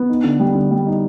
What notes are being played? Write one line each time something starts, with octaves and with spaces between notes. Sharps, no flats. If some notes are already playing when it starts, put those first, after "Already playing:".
Already playing: B3
D#4
D3
G3
D3
G3
D#4